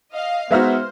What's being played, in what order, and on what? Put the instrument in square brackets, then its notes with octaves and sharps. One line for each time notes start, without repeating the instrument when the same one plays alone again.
[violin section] D#5 F5
[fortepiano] G#3 D#4 F#4 [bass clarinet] B3 [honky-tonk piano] B4 E5 F6 [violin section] C5